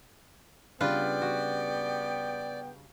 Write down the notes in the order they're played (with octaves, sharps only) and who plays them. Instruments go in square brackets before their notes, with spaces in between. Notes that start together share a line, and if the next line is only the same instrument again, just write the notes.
[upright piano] C#3 G3 D4 [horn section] B3 G5 [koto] F4 B4 [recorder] D5
[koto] F#4